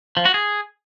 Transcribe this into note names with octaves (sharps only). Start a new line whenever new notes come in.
F3
F#4
G#4